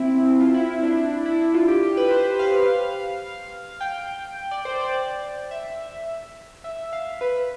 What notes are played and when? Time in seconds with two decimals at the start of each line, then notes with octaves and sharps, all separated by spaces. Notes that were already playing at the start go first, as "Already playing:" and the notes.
Already playing: C4 E4
0.41 F4
0.54 E4
0.69 E4
0.83 D4
0.97 D4
1.26 E4
1.54 F4
1.68 G4
1.82 G4
1.97 B4
2.11 C5
2.39 F5
3.81 G5
4.51 D5
4.65 C5
4.80 D5
5.51 E5
6.64 E5
6.93 F5
7.21 B4